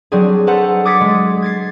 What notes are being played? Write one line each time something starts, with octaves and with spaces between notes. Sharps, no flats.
F#3 G3 C4 D4 G#4
A4 B4 C5 F#5 A#5
D6 D#6 G#6 A6 B6 C#7
G#3
G#6 A6 C7